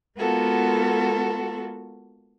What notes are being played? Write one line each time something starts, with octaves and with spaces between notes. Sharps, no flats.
G#3 A#3 B3 F4 F#4 A4